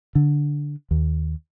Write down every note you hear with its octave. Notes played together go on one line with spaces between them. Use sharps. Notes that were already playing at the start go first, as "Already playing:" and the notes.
D3
D#2